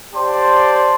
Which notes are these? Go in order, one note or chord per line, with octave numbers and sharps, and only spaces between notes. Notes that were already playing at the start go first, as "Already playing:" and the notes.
G4 C5 D5 A5 C6